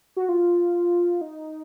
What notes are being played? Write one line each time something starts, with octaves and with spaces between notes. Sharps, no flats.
F#4
F4
D#4